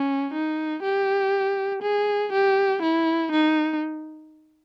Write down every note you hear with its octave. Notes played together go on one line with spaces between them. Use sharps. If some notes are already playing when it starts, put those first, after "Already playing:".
Already playing: C#4
D#4
G4
G#4
G4
E4
D#4